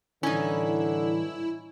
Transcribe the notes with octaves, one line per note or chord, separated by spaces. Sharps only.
A2 D3 E3 G3 C#4 D#4 E4